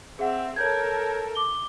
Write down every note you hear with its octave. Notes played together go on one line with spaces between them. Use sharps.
C4 G#4 E5 F#5
A4 A#4 C#5 G6 G#6
D6 G7